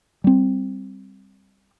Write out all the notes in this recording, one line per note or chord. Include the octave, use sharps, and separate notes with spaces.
G3 C4